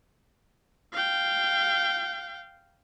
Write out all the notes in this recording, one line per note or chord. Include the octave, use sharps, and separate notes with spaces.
F5 G5